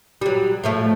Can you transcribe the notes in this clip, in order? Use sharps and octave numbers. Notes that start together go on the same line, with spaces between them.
F#3 G3
A2 F3 A3